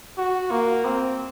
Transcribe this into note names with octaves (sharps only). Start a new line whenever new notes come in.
F#4
A#3
C4